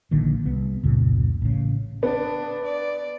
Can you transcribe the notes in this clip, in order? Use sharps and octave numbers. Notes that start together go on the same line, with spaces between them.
A#1 A#2 D3 D#3
C2 B3
F1 C#2 A#2 C#3
A1 C#3
B3 D4
D5